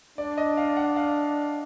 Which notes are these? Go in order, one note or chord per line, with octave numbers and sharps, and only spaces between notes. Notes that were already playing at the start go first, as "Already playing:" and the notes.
D4 D5
D#5
F5
F#5
F5